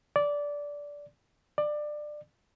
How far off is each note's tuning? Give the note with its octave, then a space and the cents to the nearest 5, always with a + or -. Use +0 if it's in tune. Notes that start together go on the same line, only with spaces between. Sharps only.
D5 -15
D5 +20